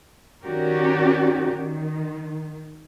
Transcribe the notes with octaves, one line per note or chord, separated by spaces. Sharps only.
D#3 C#4 F#4 G4 A#4 D5
D#3